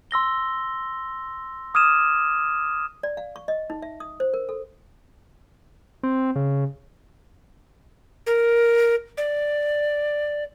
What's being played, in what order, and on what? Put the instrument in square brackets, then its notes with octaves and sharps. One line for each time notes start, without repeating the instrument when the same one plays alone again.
[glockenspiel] C6 E6 A#6 G7
D6 D#6 F6 G#6 D#7 E7
[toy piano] D5
F5
C#6
D#5
D#4
E5
D#6
C5
A#4
A4
[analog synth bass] C4
C#3
[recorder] A#4
D5